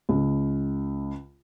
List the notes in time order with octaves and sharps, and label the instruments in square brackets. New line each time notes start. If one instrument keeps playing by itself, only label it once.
[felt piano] C#2